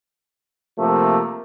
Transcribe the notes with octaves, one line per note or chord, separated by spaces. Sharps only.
C3 F3 A3 A#3